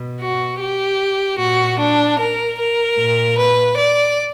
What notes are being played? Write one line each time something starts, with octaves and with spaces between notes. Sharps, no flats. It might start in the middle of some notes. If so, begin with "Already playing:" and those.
Already playing: B2
F#4
G4
A#2 F#4
D4
A#4
A#4
A#2
B4
D5